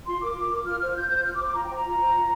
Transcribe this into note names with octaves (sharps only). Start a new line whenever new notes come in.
F4 C6
A#4 D6
F4
A#4
F4 F6
C5 F6
F6
F4 G6
C5 G6
F4 F6
D6
C5
D6
F4 A#5
C5 G5
A#5
F4
C5
F4